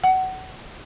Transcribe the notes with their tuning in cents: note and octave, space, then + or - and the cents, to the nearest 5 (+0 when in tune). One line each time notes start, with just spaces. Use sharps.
F#5 +25